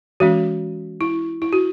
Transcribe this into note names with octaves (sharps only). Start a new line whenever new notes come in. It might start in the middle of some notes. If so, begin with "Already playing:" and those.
E3 G#3 C#4 F#4
E4
E4
F#4